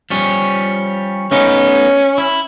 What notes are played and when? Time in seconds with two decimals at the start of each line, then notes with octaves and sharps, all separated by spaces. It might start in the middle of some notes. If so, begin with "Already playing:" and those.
0.10 F3 G3 C#4
1.31 A3 B3 C#4 D#4
2.18 E4